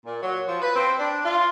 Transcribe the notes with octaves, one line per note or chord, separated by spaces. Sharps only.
A#2
F#3
F3
B4
C4
D4
F4